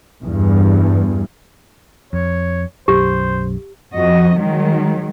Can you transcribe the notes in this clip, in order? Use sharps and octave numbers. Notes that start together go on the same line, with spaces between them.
E2 G2
F2 C#5
B1 F#2 G4 C5
F2 F#4 D#5
D#3 F#3 G#3